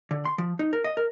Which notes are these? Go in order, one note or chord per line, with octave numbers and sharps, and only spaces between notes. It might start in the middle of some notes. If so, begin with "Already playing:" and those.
D3
C6
F3
D#4
A#4
D#5
A#4